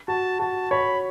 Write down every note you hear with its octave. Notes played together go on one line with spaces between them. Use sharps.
F#4 A5
F#4 A5
C#5 B5